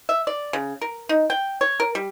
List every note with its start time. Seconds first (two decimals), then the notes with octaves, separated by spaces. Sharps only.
0.09 E5
0.27 D5
0.53 C#3
0.81 A#4
1.09 D#4
1.30 G5
1.61 C#5
1.80 A#4
1.95 G3